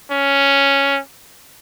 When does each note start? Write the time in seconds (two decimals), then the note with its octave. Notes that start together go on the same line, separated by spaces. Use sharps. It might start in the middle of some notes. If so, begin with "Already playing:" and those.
0.11 C#4